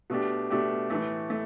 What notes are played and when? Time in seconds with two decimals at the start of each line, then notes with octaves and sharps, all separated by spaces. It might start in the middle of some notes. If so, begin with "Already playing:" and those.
0.10 B2 A3 D4 G4
0.50 B2 A3 D4 G4
0.90 A2 E3 A3
1.30 A3